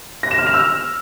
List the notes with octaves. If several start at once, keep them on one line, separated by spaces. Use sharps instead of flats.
A#6
E7
F6
F7
E6